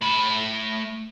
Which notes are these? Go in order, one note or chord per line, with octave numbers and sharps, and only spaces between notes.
A3 B5